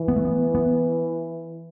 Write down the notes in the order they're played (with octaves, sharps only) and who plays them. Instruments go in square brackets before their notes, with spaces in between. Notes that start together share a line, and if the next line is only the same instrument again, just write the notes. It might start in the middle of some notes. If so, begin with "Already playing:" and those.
Already playing: [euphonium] E3
[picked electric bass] B3
A3
B3
B3